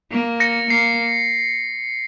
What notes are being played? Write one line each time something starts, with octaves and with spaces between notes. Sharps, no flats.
A#3
A#6 C#7
A#3 C7